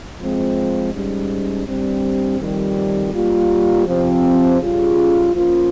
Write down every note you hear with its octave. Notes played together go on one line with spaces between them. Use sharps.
F3 G#3 C4
G#2 G3 C#4
G2 G3 C4
F2 D#3 G3
G3 A#3 F4
C3 F3 C4
C#3 G3 C#4 F4 G#4
F3 A#3 C#4 F4